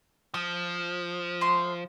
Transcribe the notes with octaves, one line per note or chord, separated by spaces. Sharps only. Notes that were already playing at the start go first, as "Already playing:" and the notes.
F3 D#6
A3 C6